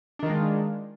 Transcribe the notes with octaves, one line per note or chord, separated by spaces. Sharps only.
D#3 G#3 D4 F4